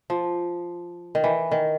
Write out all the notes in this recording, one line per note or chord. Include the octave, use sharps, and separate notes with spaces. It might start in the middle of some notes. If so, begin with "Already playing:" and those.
F3
D#3
E3
D#3